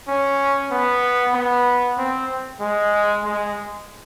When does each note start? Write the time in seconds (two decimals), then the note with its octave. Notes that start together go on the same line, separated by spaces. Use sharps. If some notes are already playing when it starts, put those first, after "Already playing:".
0.08 C#4
0.71 B3
1.34 B3
1.97 C4
2.60 G#3
3.24 G#3